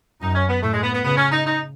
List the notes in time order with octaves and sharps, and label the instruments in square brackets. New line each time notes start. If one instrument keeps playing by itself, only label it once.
[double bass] F#2 [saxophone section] D#4
[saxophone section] C#4
B3
[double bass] A2 [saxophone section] A3
[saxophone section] G#3
B3
B3
[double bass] C#3 [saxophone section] B3
[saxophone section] C#4
D#4
D#4